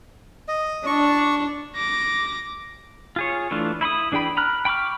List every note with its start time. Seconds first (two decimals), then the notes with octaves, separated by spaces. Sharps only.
0.48 D#5
0.86 D4 C#6
1.76 D6 A#6
3.16 F4 G#4 C#5
3.51 E3 A3 D4 F4
3.81 E4 B5 C6 D#6
4.12 E3 D4 G#4 G5 B5
4.37 A#5 B5 F6 F#6
4.65 G5 B5 C#6 D6 F6